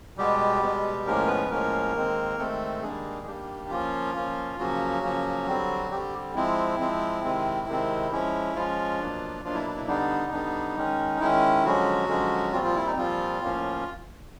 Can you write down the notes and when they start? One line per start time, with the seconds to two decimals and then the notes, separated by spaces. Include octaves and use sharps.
0.17 B2 G3 G#3 B3 G4
0.62 B2 G#3 B3
1.06 A2 F3 G#3 A#3 C#4 A#4
1.28 B3 B4
1.50 A2 F3 G#3 A#3 C#4 A#4
1.95 D#3 G#3 C4
2.38 D#3 G#3 A3 C4 A4
2.82 D#3 G3 G#3 A#3 D4 G#4
3.26 D#3 G3 A#3 D4 G4
3.70 F3 A#3 C#4 F4
4.15 F3 A#3 C#4
4.58 C#3 F3 F#3 A#3 C#4 F#4
5.03 C#3 F3 A#3 C#4
5.47 D3 G3 C4
5.91 D3 G3 C4 G4
6.35 F3 G#3 C4 E4
6.79 F3 G#3 C4
7.24 C3 D#3 G#3 C4
7.68 C3 D#3 G#3 C4
8.11 F3 G#3 C#4 E4
8.55 F3 G#3 C#4 F4
8.99 B2 F#3 A#3 D4
9.44 B2 F3 F#3 A#3 D4 F4
9.54 E4
9.77 E4
9.88 D3 G3 B3 D4 D#4
10.32 D3 G3 B3 D4
10.77 D#3 G#3 C#4
11.20 D#3 G#3 C#4 E4
11.64 D3 F3 F#3 G#3 C#4 F#4
12.08 D3 F3 G#3 C#4
12.52 A#2 F3 G3 C4 F4
12.63 F3 F4
12.75 E4
12.86 D#4
12.96 A#2 F3 G3 C4 F4
13.42 A2 F3 A#3 C#4